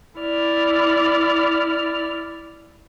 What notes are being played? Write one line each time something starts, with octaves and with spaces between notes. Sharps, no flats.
E4 D5 F6